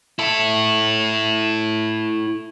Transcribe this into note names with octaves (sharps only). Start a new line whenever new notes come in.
E4 A4